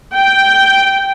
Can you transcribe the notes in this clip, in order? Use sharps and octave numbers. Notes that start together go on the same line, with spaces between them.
G5